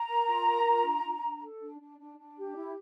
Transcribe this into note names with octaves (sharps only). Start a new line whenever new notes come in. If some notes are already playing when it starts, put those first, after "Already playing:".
Already playing: A#5
A#4
F4
A#4
F4
D4
D4
D4
A4
D4
D4
D4
D4
G4
E4